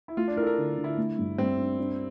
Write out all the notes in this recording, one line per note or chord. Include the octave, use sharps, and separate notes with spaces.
E4
A3 F4
D4
E4 A#4
A4
A#4
D3
D3
E4
A3
G2
G2 C4
D4
D4